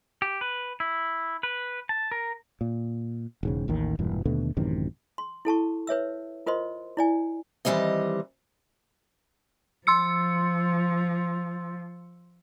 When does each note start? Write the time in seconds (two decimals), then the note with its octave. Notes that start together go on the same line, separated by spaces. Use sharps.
0.22 G4
0.41 B4
0.80 E4
1.43 B4
1.89 A5
2.12 A#4
2.61 A#2
3.43 E1 G#2 C#3
3.68 A1 D#2 D#3
3.99 E1 G2 A#2 E3
4.25 D#2 B2 D3 A3
4.57 A1 F#2 C3 D#3
5.18 C6
5.45 E4 A4 A5 C#6
5.87 B4 C#5 E5 E6
6.47 F4 A#4 C5 D#5 C6
6.97 E4 D5 G#5
7.65 D#3 E3 G3 C4 D#5
9.87 F3 C6 E6 C#7